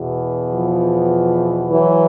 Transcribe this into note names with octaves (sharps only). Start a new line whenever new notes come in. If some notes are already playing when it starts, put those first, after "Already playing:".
Already playing: E2 B2
F3
E3 F#3